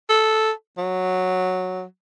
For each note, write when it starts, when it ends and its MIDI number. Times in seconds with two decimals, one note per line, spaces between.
0.09 0.51 69
0.78 1.83 54